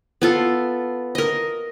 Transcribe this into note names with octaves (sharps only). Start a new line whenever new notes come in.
B3 F4 A4
A#4 D#5